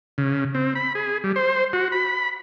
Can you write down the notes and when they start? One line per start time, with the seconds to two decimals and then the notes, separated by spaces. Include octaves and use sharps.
0.18 C#3
0.55 C4
0.75 B5
0.95 G#4
1.24 G3
1.36 C5
1.73 F#4
1.92 B5